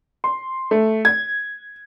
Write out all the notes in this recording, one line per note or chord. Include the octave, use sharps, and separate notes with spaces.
C6
A3
G#6